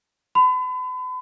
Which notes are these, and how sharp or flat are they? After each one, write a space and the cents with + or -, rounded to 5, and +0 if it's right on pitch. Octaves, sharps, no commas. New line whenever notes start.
B5 +40